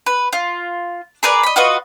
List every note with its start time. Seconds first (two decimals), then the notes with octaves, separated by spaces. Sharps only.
0.06 B4
0.33 F4
1.23 G#4 A#4 B4 D5
1.43 D#5 B5
1.56 F4 F#4 B4 D#5